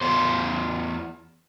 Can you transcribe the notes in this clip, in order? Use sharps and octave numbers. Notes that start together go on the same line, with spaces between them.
E2 C5